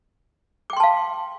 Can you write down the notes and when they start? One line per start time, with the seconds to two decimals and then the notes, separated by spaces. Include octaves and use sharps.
0.70 D6
0.73 G5
0.77 C6
0.80 A5
0.83 F5